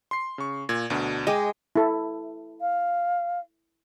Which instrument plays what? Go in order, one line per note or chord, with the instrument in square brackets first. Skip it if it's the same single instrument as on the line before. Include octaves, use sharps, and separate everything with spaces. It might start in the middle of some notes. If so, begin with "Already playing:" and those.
[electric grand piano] C6 C7
C#3 C#6
A#2 G#6
D2 B2 D4
[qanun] G#3 [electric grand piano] D#5 G5 D6
[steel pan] E4 A4
[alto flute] F5